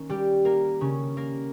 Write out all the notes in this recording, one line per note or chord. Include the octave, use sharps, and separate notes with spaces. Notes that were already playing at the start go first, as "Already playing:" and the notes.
Already playing: D#3 A#3 C#4
G3 G4
A#3 A#4
C#3 C#4
A#3 A#4